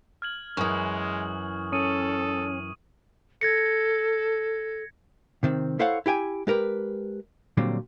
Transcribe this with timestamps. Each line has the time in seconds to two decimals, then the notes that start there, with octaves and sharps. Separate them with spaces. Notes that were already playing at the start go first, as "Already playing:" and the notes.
0.22 F6 G#6 F#7
0.57 F#2 E3 G#3 C#6 D#6
1.72 C#4 A4 D#6 D#7
3.41 A4 G#6 A#6 C#7
5.43 C3 D#3 C4
5.79 E4 A4 C5 C#5 F5 F#5
6.06 E4 G4 G5 G#5
6.47 G#3 G4 A#4 B4
7.57 A#2 D3 F#3 G3 C4